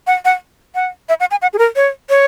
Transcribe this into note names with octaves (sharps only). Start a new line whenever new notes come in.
F#5
F#5
F#5
E5
F#5
G#5
F#5
G#4
A#4
C#5
C#5